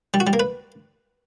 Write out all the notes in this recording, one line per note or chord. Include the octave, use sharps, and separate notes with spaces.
G3
F#4
G3
A#3
B4